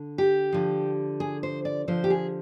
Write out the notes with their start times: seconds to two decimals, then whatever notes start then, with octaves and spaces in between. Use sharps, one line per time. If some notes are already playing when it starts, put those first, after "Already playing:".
Already playing: D3
0.18 G4
0.53 D3 F3
1.20 G#4
1.43 C5
1.65 D5
1.88 D3 F3 C5
2.04 G4
2.10 G#4